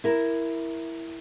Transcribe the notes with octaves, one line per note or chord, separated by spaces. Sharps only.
E4 A#4